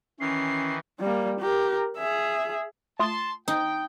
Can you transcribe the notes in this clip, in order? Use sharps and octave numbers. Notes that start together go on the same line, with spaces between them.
D#3 E3 C#4 C7
G3 A#3
G4 A#4
G#4 E5
A3 F4 A5 C6 D#6
D#4 G5